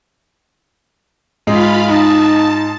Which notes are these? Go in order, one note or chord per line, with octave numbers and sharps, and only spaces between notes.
G#2 G#3 F4 F5 B5
D#4 A5